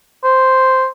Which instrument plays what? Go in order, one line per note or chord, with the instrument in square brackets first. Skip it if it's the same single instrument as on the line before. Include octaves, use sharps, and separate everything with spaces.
[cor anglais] C5